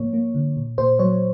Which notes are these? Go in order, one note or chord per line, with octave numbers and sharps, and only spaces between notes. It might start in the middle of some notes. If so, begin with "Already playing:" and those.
Already playing: G#2 F3 A#3 C#5
A#3
D3
A#2
A#2 C5
F#3 C#5